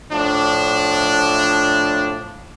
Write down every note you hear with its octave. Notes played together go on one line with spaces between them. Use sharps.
A2 F3 D4